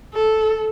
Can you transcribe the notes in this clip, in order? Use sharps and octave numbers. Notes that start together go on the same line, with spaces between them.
A4